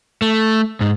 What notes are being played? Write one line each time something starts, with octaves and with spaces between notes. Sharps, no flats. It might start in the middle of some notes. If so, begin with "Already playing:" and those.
A3
G#2